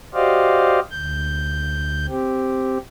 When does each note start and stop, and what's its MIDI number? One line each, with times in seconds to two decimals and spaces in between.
0.14 0.80 66
0.14 0.80 67
0.14 0.80 72
0.14 0.80 74
0.14 0.80 75
0.14 0.80 77
0.91 2.06 38
0.91 2.06 91
2.09 2.78 60
2.09 2.78 67